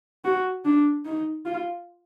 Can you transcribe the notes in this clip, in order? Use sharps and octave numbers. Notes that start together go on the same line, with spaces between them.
F#4
D4
D#4
F4